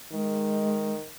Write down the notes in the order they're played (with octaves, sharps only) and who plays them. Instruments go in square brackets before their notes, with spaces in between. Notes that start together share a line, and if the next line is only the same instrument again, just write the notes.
[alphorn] D#3 [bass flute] G#3